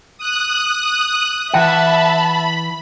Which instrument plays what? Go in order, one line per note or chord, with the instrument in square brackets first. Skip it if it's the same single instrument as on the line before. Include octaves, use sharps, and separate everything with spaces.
[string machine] D#6 F#6
[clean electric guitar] E3 F#5 [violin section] E5 A5 [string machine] B5